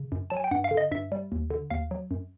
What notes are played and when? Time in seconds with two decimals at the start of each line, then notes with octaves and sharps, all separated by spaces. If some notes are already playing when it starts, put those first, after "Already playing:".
Already playing: C#3
0.12 F#2
0.30 F#3 A5
0.37 G#5
0.44 G5
0.51 G2 F#5
0.64 F5
0.71 D3
0.77 D#5
0.92 G2 E5
1.12 G3
1.32 D#2
1.50 D3
1.70 D#2 F5
1.91 F#3
2.11 F#2